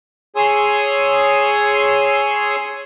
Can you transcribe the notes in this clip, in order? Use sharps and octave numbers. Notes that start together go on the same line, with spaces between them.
G#4 C#5 G#5 C6 D#6 E6